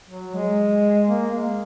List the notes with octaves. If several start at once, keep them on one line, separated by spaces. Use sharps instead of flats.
F#3
G#3
A#3
G#3